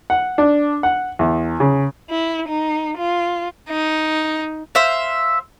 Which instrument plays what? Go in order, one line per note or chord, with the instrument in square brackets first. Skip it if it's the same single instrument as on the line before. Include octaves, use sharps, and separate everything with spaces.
[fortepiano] F#5
D4
F#5
E2
C#3
[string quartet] E4
D#4
F4
[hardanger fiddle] D#4
[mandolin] C5 E5 F5